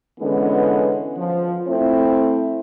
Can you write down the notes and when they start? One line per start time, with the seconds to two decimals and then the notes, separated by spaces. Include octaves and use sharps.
0.19 D3 E3 G#3 B3 C#4
1.17 F3
1.67 A3 C4 E4